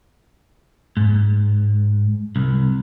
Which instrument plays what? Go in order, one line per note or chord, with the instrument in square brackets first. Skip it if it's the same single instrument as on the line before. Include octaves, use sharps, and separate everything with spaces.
[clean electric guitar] G#2
C2